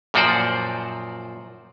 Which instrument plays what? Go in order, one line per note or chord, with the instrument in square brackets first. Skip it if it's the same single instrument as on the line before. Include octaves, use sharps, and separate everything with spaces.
[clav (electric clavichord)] F#2 A#2 F3 F#4 C5 D5